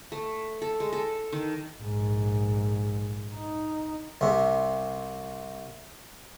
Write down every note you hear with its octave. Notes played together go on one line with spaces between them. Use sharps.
A3
A4
G#3
A4
D#3
A#1 G#2
D#4
C2 C3